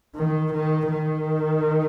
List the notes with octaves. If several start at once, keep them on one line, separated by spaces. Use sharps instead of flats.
D#3
D#3
D#3